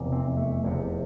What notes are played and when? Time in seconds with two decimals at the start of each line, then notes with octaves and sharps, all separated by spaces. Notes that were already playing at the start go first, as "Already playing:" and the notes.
Already playing: F1 E2 C3
0.12 C4
0.37 A3
0.63 F1 E2 C3